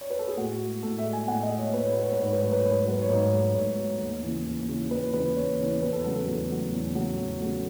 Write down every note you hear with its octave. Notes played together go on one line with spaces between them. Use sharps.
C#5
B4
A4
G#4
A2 F#4
G#3
A2 A4
E5
G#3
G#5
A2 F#5
D#5
G#3
C#5
A2 B4
C#5
G#3 B4
C#5
B4
G#2 C#5
B4
F#3 A3 C#5
B4
G#2 C#5
B4
C#5
F#3 A3 B4
C#5
G#2 B4
F#3 A3
G#2 C#5
F#3 A3
D#2
C#3 E3
D#2
C#3 E3
D#2 B4
C#3 E3 B4
D#2 C#5
C#3 E3
E2 B4
A4
C#3 F#3 A3 A4
A4
E2 A4
C#3 F#3 A3
E2
C#3 F#3 A3
E2
C#3 F#3 A3